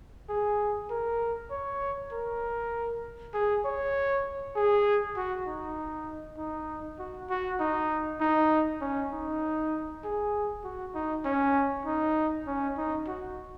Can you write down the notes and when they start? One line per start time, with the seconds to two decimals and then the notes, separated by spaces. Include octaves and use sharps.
0.29 G#4
0.90 A#4
1.51 C#5
2.12 A#4
3.34 G#4
3.65 C#5
4.56 G#4
5.17 F#4
5.47 D#4
6.38 D#4
6.99 F#4
7.30 F#4
7.60 D#4
8.21 D#4
8.81 C#4
9.12 D#4
10.04 G#4
10.64 F#4
10.95 D#4
11.25 C#4
11.86 D#4
12.47 C#4
12.77 D#4
13.08 F#4